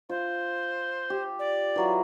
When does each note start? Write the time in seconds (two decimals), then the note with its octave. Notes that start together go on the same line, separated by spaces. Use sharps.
0.09 F4 C5
1.10 G4
1.39 D5
1.76 E3 F#3 F4